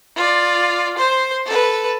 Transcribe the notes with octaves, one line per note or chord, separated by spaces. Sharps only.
F4 D5
C5 C6
A4 B4